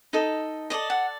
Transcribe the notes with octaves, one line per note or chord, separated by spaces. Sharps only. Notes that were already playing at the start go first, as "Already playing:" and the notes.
D#4 A4 D#5
A4 D5 D#5
F#5